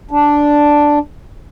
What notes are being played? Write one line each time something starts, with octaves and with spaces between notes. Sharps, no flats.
D4